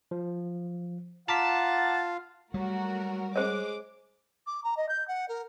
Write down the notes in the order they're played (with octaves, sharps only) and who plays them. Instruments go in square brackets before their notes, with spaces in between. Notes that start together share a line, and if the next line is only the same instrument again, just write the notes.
[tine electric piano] F3
[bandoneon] F4 F5 [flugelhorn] F#5 [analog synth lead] A5 [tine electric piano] A#5 D6 B6
[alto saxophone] F#3 [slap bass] G3 [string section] A3 F#4 A#4
[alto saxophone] G#3 [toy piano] C5 C#5 [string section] D6
[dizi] D6
A#5
D#5
G6
F#5
A#4